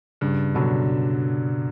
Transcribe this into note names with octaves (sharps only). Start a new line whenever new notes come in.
G2 C#3
B2 D3 F#3